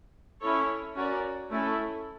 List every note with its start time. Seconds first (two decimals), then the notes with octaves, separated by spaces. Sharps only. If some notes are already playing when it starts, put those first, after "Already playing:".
0.41 C#4 E4 A4 C#5
0.95 C#4 F#4 A#4 D5
1.50 A3 C#4 E4 A4